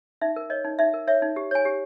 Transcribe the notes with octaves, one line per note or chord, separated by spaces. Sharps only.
D#4 E5
A#4
C#5 D#5
D#4
D#4 E5
A#4
C#5 E5
D#4
G4
C#5 G#5
G4